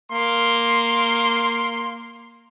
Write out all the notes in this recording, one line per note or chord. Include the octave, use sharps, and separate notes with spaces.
A#3 C6